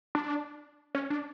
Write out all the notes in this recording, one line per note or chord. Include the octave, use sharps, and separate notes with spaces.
D4
C#4
D4